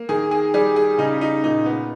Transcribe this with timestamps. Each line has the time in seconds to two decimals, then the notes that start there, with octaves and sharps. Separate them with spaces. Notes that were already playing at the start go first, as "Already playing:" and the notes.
Already playing: A#3
0.09 D#3 G#4
0.31 G#4
0.54 G3 G#4
0.76 G#4
0.98 C#3 D#4
1.21 D#4
1.44 A#2 D#4
1.66 B3